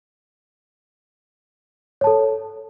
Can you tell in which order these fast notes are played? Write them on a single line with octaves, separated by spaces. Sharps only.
C#5 A5 A4